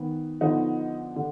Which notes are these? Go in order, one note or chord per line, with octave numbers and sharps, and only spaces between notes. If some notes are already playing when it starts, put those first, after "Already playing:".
Already playing: D#3 B3
D3 F3 B3 D#4
D3